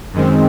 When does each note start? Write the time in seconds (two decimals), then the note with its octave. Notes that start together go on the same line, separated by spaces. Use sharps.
0.13 F#2 D#3 G#3 C4